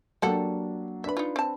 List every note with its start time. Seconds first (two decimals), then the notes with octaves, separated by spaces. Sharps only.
0.22 F#3 G3 A#3 D4 A4 F#5
1.04 D4 B4 E5 B5
1.17 D#4 F4
1.36 C4 A5